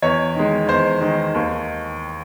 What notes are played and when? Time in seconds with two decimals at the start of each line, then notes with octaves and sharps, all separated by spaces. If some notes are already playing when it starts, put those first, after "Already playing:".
0.02 E2 C#5
0.35 D#3 G#3
0.68 E2 C5
1.01 D#3 G#3
1.34 D#2